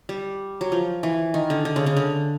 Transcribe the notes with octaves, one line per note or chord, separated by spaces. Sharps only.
G3
F#3
F3
E3
D#3
D3
D3
C#3
C#3
D3